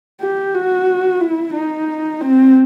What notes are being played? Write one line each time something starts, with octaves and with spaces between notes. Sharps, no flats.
G4
F#4
E4
D#4
C4